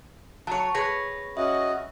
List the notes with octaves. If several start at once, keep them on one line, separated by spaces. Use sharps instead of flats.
F#3 C#5 A5
G#4 B4 C#5 A#6
C#4 F#4 D#5 E5